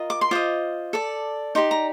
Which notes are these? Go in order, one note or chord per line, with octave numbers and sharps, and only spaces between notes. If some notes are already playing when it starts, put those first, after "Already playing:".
Already playing: F4 A#4 D#5
D6
C6
F4 C5 D#5 D6
A4 D5
D#4 G4 D5 C6
A#5